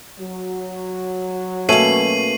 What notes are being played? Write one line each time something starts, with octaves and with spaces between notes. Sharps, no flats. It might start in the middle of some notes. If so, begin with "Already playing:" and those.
F#3
B2 A3 A#3 C#4 C7 D#7 F#7